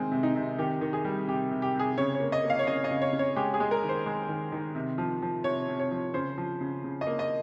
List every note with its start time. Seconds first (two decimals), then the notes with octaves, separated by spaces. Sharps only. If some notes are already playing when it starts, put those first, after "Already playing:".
Already playing: C3 D#3 G#3 C4
0.11 C3
0.23 D#4
0.36 C3
0.58 D#3 G4
0.81 D#3
0.93 G#4
1.05 G3
1.28 C3 G4
1.51 C3
1.62 G4
1.75 C3 G#4
1.98 C#3 C#5
2.15 C#5
2.20 A#3
2.32 D#5
2.44 A#3
2.50 F5
2.59 C#5
2.67 C#3 D#5
2.84 D#5
2.91 C#3
3.02 C#5
3.13 C#3
3.19 C#5
3.36 G#3 G4
3.54 G#4
3.60 G#3
3.71 A#4
3.83 D#3
3.89 C5
4.06 G#3
4.28 D#3
4.52 D#3
4.75 C3
4.98 F3
5.22 F3
5.44 C3 C#5
5.68 C3
5.79 C#5
5.91 F3
6.14 C#3 C5
6.38 F3
6.61 C#3
6.84 C#3
7.01 D#5
7.07 A#3
7.19 D#5